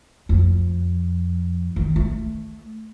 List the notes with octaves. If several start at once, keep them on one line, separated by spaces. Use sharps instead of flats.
F2
D#3
A3